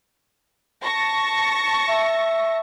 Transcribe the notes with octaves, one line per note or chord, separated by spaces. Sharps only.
A5 C#6 A#6
E5